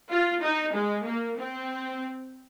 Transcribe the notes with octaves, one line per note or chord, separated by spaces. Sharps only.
F4
D#4
G#3
A#3
C4